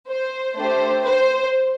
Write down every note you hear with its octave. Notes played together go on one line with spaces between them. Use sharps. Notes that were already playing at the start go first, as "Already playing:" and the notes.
C5
A3 D4 G4 C5
C5